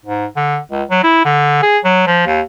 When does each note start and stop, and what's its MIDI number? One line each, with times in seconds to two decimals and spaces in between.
0.05 0.26 44
0.37 0.58 50
0.71 0.83 37
0.91 1.03 54
1.03 1.21 64
1.25 1.63 50
1.63 1.78 68
1.85 2.05 54
2.07 2.24 53
2.27 2.41 39